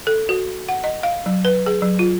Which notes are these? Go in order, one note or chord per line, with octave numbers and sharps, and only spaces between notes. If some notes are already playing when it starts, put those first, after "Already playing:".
A4
F#4
F#5
D#5
F5
F#3
B4
G#4
F#3
F4